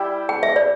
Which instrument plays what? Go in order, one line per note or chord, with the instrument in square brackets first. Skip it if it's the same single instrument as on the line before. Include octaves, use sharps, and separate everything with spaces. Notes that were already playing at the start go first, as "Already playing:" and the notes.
Already playing: [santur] G3 E4 G4
[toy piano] G5
E5
D5